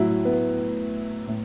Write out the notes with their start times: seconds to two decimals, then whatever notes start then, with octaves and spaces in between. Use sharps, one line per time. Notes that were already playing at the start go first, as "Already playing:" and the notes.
Already playing: A2 F#3 E4
0.25 B3
1.27 A2